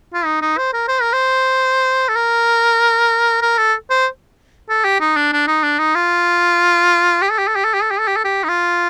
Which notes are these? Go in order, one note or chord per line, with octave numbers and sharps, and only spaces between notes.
F4
D#4
D#4
C5
A#4
C5
A#4
C5
A4
A#4
A#4
A4
C5
A4
G4
D#4
D4
D4
D#4
D4
D#4
F4
G4
A4
G4
A4
G4
A4
G4
A4
G4
A4
G4
A4
G4
D#4
F4